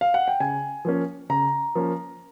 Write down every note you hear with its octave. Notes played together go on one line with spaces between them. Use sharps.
F5
F#5
G5
C#3 G#5
F3 A#3 C#4
C#3 A#5
F3 A#3 C#4